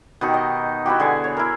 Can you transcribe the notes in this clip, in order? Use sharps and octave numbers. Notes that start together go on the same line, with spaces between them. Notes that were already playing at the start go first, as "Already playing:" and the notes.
B2 D#3 D#4 G4
D#5
B3 E4 F#4 G4
D3 G#4 G#5
C#5
E4 A#4